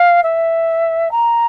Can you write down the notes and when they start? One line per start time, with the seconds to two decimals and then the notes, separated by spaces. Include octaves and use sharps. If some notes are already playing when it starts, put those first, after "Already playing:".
Already playing: F5
0.23 E5
1.11 A#5